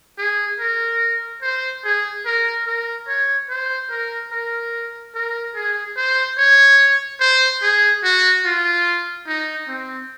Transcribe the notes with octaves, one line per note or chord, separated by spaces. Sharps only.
G#4
A#4
C5
G#4
A#4
A#4
C#5
C5
A#4
A#4
A#4
G#4
C5
C#5
C5
G#4
F#4
F4
D#4
C4